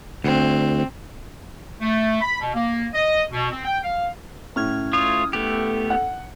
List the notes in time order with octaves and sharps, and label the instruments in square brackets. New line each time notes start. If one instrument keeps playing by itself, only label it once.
[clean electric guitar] D2 [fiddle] C4
[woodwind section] A3
B5
B2
A#3
D#5
B2
C4
G5
F5
[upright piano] A2 [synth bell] C#4 F6 G#6
[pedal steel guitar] A3 F4 C#5 [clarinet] D#6
[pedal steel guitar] A3 B3 G4 [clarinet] A4
[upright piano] F#5